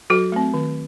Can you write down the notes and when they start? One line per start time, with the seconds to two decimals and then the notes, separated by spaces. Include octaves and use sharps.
0.10 F#3 F#4 A4
0.32 A3 C4
0.54 D#3